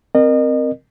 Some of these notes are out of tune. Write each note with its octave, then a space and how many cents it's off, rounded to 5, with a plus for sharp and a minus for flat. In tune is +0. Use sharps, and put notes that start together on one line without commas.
C4 +0 A#4 +0 D#5 -35